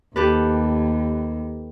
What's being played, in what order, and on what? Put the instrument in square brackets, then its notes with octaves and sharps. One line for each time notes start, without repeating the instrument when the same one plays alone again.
[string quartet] D#2 [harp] G4 A4 B4